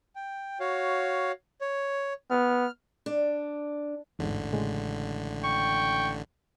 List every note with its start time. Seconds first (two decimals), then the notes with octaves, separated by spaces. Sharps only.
0.15 G5
0.60 F#4 C#5 F5
1.61 C#5
2.30 B3 F6
3.06 D4
4.19 A1 E2 G#2 D3
4.53 A2 C#3 G#3
5.44 G5 C#6